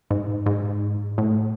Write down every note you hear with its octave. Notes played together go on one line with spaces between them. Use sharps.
G#2
G#2
A2